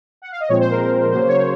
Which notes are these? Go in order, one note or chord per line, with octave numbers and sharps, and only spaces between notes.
F#5
F5
D#5
A#2 F3 G#3 C4 C#5
C5
A#4
C5
C#3 F#3 A#3 C5
C#5